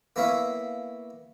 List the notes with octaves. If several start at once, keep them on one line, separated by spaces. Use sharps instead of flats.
A#3 B3 E4 C#5 E5 F5